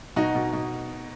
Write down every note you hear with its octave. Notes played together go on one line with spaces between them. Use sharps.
B2 D#4 F#4
B2
B2